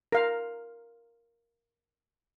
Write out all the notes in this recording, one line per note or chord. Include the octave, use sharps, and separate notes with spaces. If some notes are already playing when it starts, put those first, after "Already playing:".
A#4 F5